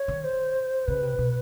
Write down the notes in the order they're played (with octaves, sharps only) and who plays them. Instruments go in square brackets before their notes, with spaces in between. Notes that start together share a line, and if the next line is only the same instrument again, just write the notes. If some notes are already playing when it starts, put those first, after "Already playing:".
Already playing: [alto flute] C#5
[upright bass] D#3
[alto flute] C5
[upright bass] C#3 [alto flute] B4
[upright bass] C3
B2